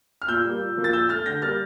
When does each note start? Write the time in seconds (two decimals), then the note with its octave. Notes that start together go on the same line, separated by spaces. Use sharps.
0.22 F6
0.28 A#2 E6 G6
0.45 G3 A#3
0.61 A#2
0.77 F3 A#3
0.84 A6
0.93 A#2 E6 G6
1.09 A3 F6 A6
1.26 D3 G6 A#6
1.42 G3 A#3 F6 A6